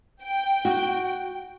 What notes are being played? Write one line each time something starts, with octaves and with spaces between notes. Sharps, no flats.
G5
F#4